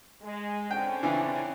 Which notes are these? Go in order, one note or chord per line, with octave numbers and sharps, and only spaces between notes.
G#3
D3 C4 C#4 G5
C#3 E3 D4